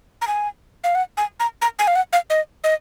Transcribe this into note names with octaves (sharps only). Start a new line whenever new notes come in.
A#5
G#5
F5
F#5
G#5
A#5
A#5
G#5
F5
F#5
F5
D#5
D#5